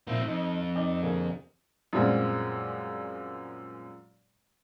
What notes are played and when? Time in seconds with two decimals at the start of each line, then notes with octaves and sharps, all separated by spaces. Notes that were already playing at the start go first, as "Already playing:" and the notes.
0.07 A#2 F3 C4 D#4 E4
0.27 F2 D#4
0.75 D#4 D5 G5
1.03 D3 A#3 G#4
1.93 F#2 A#2 G3 G#3 C4